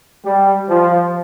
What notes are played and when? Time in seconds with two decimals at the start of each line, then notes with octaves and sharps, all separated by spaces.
0.26 G3
0.69 F3